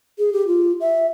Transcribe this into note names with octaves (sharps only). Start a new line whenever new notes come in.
G#4
G4
F4
E5